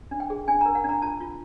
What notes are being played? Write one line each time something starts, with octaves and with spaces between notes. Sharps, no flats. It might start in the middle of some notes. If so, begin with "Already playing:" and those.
D4
G5
G#4
D4 G#5
A#4 A#5
F#5
D4 A#5
F4 A5
F4